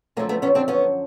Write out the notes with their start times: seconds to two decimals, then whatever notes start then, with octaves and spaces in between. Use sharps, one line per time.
0.17 F#2 D3 F3 A3 A#3
0.29 A3 B3
0.42 B3 C#4
0.55 C4 D4
0.68 B3 C#4